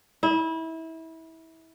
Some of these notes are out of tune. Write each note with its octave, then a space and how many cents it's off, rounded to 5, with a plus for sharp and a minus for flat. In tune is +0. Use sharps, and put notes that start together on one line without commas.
E4 -25